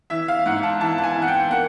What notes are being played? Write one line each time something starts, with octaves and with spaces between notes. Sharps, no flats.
E3 E5
F5
G#2 F#5
A5
E3 A5
A5
G#5
E3
F#5
G5
A#3 F#5